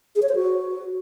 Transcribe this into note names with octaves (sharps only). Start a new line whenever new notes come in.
G#4
C#5
C5
F#4